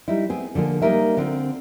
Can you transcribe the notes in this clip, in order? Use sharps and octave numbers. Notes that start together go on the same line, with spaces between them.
G3 D#4 E4
B3 C4 G#4
D3 F3 A#3 G#4
G3 A#3 D#4 F#4 A#4 E5
D3 C4 F4